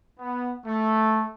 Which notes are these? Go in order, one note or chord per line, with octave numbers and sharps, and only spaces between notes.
B3
A3